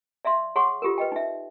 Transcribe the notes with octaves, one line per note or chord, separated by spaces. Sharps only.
D5 E5 F5 C6
G#4 C#5 F#5 C6 C#6
F4 G4 A4 A#4
B4 D#5 G5
D#4 E5